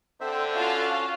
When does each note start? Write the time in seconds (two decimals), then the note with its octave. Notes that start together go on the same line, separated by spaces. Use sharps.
0.21 D3 C4 A4 C5 E5
0.55 C#4 F4 F#4 F5 A5